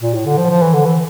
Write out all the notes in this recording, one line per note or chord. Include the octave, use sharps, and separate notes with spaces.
A#2
A2
D3
F3
F3
E3
D3
E3